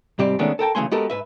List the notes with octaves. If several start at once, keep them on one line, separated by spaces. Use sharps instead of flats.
G#2 C3 G3 C4 G4 D5
D#3 G#3 A3 B3 C#4 D4
A4 A#4 G5 A5
B1 C#3 E3 A3 G#5 C6
G#3 B3 F#4 G4 A4 A#4
G#2 B4 E5